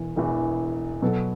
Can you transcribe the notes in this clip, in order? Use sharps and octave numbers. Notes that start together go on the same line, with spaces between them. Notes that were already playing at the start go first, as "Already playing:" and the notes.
Already playing: E1 E2 E3
E1 E2 E3
B2 F#3 B3 A4